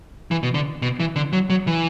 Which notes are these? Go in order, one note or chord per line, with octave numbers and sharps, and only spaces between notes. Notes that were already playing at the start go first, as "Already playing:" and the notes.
E3
B2
D3
B2
E3
D3
F#3
F#3
E3